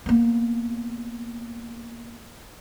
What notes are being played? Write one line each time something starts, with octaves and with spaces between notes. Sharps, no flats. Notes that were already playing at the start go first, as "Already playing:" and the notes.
A#3 B3